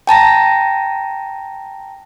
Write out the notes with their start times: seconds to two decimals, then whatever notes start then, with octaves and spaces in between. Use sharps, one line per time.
0.07 G5 A5 A#5 A#6